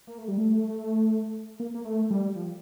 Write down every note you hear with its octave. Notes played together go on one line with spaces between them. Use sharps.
A#3
A3
G3
A3
A#3
A#3
A3
G3
F3